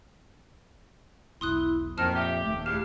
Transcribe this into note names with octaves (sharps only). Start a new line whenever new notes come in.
E1 B1 E4 C6 D#6 F#6
F2 A#2 D#3 C5 A5 F6
G4 E5
D#1 D#2 A3
E2 D4 G4 F5